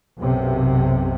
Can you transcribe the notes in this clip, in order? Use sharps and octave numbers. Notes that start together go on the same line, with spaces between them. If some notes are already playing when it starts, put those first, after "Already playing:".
B1 F#2 C3